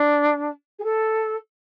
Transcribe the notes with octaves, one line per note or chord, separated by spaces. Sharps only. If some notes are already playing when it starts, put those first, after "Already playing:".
Already playing: D4
G#4
A4